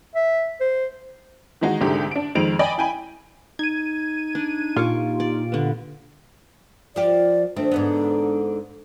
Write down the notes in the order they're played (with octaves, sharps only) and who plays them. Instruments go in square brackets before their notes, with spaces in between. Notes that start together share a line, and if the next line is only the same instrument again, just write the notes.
[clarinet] E5
C5
[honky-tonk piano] D#3 E3 G#3 D#4 F#4
C2 G#2 D3 G4
D4 D7
F2 D#3 G#3 C4 D7 F7
D5 D#5 G5 G#5 B5
E4 G5 G#5 B5
[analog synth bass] D#4 [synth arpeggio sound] G#6 D#7
[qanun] D4
[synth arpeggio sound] A#2 F4 G4 [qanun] G#5 C#6 D6
[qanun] D5
D3 B3
[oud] F3 F4 G4 [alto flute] D5
[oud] D#3 A3 C4 [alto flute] D4
[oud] G#2 D3 B3